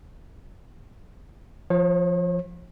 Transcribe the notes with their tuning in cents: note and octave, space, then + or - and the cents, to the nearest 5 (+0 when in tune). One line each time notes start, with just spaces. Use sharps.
F3 -5 C#5 -45